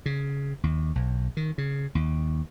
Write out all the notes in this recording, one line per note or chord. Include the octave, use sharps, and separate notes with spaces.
C#3
D#2
B1
D#3
C#3
D#2